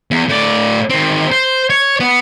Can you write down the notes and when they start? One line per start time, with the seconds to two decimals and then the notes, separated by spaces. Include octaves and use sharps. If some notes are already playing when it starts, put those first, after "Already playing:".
0.11 E2
0.29 A2 D5
0.90 D#3 C4
1.32 C5
1.70 C#5
2.00 B3